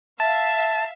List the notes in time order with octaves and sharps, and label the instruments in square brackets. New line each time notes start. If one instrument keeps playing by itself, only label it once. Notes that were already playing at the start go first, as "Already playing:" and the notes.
[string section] E5 F5 [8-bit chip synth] A5